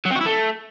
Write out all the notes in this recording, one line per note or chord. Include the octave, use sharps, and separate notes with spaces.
F#3
C4
F#4
E4
A3